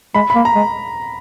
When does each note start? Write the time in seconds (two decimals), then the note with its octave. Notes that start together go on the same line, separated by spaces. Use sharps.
0.15 G#3 B5
0.30 B5
0.35 A#3
0.45 A#5
0.55 G#3